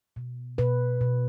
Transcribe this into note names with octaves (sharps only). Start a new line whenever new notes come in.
B2
B2 B4
B2